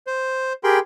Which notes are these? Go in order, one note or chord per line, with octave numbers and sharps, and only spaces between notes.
C5
G4 G#4 A#4 G5 B5 C6